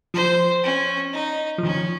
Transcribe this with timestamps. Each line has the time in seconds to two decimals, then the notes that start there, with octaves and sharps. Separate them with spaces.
0.14 F3 C5
0.63 C#4
1.13 D#4
1.58 F3
1.63 D#3 C#4